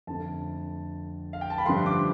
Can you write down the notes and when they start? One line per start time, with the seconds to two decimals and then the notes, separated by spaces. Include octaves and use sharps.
0.07 F2 D3 A3 A5
1.33 F5
1.41 G5
1.50 A5
1.58 B5
1.66 G2 D3 F3 A3 C6
1.86 D6